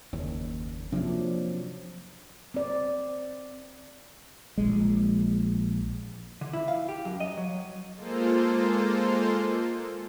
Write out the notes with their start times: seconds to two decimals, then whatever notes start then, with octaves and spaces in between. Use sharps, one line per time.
0.13 F#1 D#2
0.92 C3 F3 F#3 A#3 D4
2.54 C4 D5
4.58 A#1 G#3
6.41 D3
6.53 E4
6.68 F5
6.89 G4
7.05 F#2
7.20 D#5
7.37 F#3
7.97 G#3 A#3 F4 A4 C5